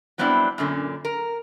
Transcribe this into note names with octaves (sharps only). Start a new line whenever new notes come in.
F#3 G3 B3 C4 D4 E4
F#2 A#2 D3 C#4
A#4